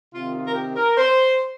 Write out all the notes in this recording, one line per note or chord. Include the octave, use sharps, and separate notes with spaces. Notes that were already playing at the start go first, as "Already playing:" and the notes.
C3 D#3 C4 F4
F4
A#4
G4
A#4
C5